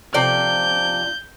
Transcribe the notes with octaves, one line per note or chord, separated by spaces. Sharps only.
C3 F3 D5 G6